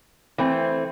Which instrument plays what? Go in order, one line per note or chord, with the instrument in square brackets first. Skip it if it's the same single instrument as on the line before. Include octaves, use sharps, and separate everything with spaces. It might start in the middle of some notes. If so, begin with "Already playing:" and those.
[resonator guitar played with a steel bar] E3 A3 C4